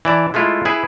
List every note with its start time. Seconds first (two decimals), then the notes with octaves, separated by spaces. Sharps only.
0.05 E3 D5 A5
0.34 G#3 A3 E4 F4
0.65 E4 G#4 B4